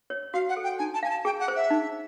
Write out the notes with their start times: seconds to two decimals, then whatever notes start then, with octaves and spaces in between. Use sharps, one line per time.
0.10 C#5
0.34 F#4 F5
0.49 F#5
0.57 A4
0.64 G5
0.79 D#4 G#5
0.94 A5
1.03 F5 G#5
1.10 A5
1.25 G#4 G5
1.40 F#5
1.48 C5
1.56 E5
1.70 D#4